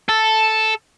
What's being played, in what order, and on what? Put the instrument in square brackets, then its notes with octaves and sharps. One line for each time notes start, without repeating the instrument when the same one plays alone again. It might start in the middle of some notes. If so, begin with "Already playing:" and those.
[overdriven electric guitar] A4